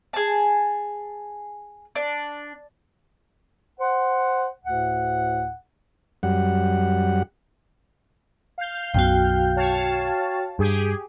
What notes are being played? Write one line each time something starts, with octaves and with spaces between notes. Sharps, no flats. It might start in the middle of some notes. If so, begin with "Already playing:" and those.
G#4 A5
D4
C5 F#5
D2 A2 F#5
F#2 G3 F#5
F5 G6
B1 F#2 B2 F#4 G5
C#5 F5 A5
G2 G4 G#4